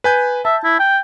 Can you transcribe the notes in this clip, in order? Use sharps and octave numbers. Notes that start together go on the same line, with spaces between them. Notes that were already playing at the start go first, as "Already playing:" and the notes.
B4 G#5 G6
E5 A5
E4
G5